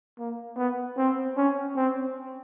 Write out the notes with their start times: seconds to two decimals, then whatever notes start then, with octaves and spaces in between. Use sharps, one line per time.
0.18 A#3
0.57 B3
0.97 C4
1.36 C#4
1.76 C4